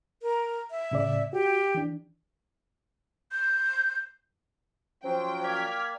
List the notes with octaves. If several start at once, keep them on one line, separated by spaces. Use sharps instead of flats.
A#4
E5
A2 C#3 D5
F#4 G4
E3 D4
G6
F3 F#3 C#4 C5 G5
A#3 D5 F6 G#6 B6